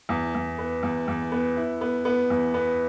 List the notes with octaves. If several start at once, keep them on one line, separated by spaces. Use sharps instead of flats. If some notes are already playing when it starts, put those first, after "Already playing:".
E2
E2
B3
E2
E2
B3
E4
B3
B3
E2
B3